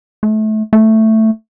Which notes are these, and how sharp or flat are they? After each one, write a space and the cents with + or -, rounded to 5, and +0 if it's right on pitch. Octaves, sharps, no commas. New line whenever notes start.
A3 -25
A3 +5